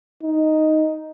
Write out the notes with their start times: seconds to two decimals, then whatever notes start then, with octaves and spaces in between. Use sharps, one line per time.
0.23 D#4